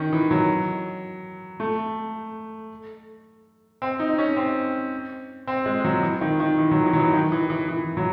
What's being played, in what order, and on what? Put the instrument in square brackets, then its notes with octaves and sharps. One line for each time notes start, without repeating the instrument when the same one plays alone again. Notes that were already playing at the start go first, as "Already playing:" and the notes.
Already playing: [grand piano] D#3 C#4
E3
F#3
A3
C4
D#4
C#4
C4
C4
G#3
F#3
E3
D#3
D#3
E3
F#3
E3
F#3
E3
D#3
E3
E3
E3
F#3